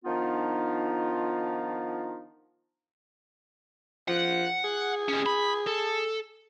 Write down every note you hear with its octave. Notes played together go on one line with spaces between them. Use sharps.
D#3 F3 B3 D4 D#4 F4
F3 F#5
G#4
G3 C#4
B5
A4